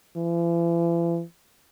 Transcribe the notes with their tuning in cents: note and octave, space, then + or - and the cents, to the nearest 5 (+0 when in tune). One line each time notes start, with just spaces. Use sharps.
E3 +45